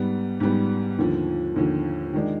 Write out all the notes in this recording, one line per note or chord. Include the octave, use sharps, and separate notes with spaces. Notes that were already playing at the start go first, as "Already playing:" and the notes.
Already playing: G#2 G3 B3
G#2 G3 B3
D#2 D3 F3
D#2 D3 F3
D#3 G#3 D4